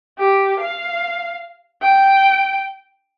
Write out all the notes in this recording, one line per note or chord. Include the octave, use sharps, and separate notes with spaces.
G4
F5
G5